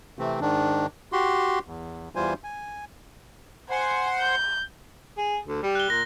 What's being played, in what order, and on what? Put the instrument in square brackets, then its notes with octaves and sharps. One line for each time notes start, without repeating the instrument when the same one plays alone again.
[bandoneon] C3 E3 A3 C4
G#2 D#3 D4
F#4 G4 C6
E2
E2 E3 G3 F4 C5 G#5
G#5
[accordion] C5 F#5 C6 [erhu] G#5
[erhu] G6
[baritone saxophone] G#4
D2
G3
[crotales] F#6 G7
[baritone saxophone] A#2 [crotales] A#6